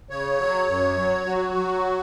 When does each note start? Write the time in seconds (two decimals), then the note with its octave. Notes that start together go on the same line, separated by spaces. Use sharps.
0.10 C#3 C#5
0.39 F#3
0.68 F#2
0.97 F#3
1.26 F#3 F#4
1.56 F#3